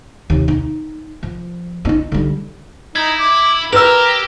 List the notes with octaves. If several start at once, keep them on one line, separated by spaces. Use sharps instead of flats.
D#2 C3
D#4
F3
G2 D#4
D3 G3
D#4 E4 G#6
D6
G4 A#4 B4 E6 A#6 E7 F7